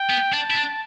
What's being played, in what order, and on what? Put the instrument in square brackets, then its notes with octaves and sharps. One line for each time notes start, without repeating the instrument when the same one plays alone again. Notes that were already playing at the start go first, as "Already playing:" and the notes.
Already playing: [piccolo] G5
[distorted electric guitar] B3
[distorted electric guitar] D4 [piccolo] A5
[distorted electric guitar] E4
D4